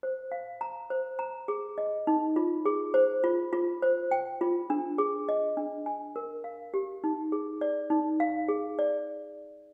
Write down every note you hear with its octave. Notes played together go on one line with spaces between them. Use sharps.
C5
F5
A#5
C5
A#5
G#4
D#5
D#4
F4
G#4
C5
F4
F4
C5
G5
F4
D4
G#4
D#5
D4
G#5
A#4
F5
G4
D#4
G#4
D5
D#4
F5
G#4
D5